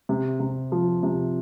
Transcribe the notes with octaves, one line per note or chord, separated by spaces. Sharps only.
C3
C3
F3
C3